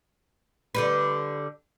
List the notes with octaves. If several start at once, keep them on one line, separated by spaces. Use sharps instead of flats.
D3 G3 B4